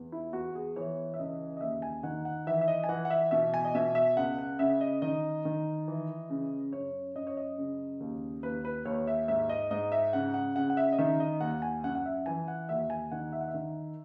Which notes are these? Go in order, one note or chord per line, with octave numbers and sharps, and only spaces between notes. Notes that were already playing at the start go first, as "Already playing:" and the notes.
Already playing: E2
E4
E2 F#4
G#4
E3 C#5
E5
C#2 D#5
D#5
D#2 E5
G#5
D#3 F#5
F#5
E3 E5
E5
D#5
G#5
E3 F#5
F#5
E5
B2 E5
G#5
D#5
B2 E5
E5
C#2 F#5
F#5
C#3 E5
D#5
D#3 D#5
D#3
E3
C#3
F#2 C#5
F#2 D#5
C#5
D#5
C#3
D#2
D#2 B4
B4
D#2 C#5
E5
G#2 E5
D#5
G#2 D#5
E5
C#3 F#5
F#5
C#3 F#5
F#5
E5
D#5
D#3 E5
D#5
D#2 F#5
G#5
F#2 F#5
F#5
E5
E3 G#5
F#5
D#2 E5
G#5
D#3 F#5
E5
F#5
E5
D#3